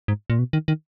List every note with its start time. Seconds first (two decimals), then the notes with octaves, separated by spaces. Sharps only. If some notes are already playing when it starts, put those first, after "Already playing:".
0.08 G#2
0.30 A#2
0.39 B2
0.53 D#3
0.68 D#3